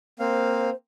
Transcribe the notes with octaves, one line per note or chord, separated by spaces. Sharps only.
A#3 C4 C5 F5